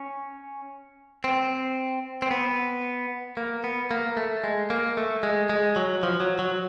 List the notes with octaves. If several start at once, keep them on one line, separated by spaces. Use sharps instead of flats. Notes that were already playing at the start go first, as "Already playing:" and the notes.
Already playing: C#4
C4
C4
B3
A#3
B3
A#3
A3
G#3
A#3
A3
G#3
G#3
F#3
F3
F#3
F#3